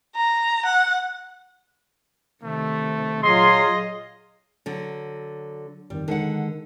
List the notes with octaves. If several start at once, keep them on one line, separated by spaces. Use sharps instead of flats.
A#5
F#5
C3 D#3 A3
A#2 F#3 F4 G#4 D#5 C6
D3 F#3
G1 F2 D#3 G3
D3 D#3 G#3 F#5